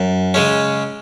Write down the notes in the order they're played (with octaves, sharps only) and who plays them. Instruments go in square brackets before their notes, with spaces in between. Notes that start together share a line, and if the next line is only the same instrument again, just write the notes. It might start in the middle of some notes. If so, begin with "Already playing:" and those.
Already playing: [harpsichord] F#2
C#3 G#3 C#4